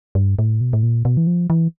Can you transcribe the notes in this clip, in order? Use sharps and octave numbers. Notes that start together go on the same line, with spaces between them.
G2
A2
B2
A2
A#2
B2
E3
F3
E3